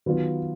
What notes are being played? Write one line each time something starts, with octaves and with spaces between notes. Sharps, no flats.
D#3 F#3 B3 F4 B4